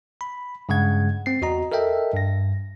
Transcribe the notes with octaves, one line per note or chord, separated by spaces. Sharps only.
B5
G2 C#3 G#3 F#5 G#6
C4 C7
E2 F#4 D#5 A#5
A4 A#4 D#5 E5 G5
G2 A#6